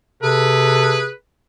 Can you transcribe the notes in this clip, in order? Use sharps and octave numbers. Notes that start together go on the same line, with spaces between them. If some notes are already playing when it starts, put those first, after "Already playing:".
C3 G#4 A4 B4